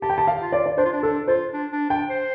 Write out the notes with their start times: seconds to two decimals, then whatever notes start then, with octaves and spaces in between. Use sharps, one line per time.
0.02 G4 A5
0.09 G5
0.18 A5
0.27 F5
0.41 F4
0.52 D5
0.66 D5
0.77 D4 C5
0.86 F4
0.93 D4
1.03 D4 A4
1.28 F4 C5
1.53 D4
1.72 D4
1.90 D4 G5
2.10 C5